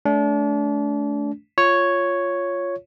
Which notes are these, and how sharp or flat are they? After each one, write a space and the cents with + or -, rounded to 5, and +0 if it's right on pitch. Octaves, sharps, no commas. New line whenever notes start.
A3 -30 D4 -35
F4 +0 C#5 +0